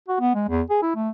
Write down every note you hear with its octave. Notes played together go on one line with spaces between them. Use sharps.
F#4
B3
G#3
E2
G#4
E4
A3